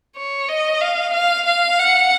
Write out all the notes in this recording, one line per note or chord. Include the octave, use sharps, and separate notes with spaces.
C#5
D#5
F5
F5
F5
F#5